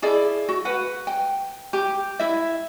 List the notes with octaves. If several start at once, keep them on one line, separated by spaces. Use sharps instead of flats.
E4 G#4 A4 D5
F#4
B4 F#5
G5
G4
E4 E5